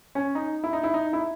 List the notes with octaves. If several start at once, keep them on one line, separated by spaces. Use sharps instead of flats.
C#4
D#4
E4
D#4
E4
D#4
E4